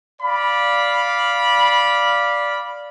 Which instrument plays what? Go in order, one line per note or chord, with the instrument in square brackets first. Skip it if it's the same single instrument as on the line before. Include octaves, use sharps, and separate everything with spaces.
[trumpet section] D5 F5 B5